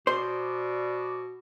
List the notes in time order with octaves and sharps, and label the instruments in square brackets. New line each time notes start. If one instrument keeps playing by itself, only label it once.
[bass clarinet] B2 [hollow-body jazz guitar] C5 [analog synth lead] D5